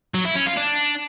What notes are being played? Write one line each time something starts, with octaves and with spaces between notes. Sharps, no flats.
F#3
E4
C#4
F4
D4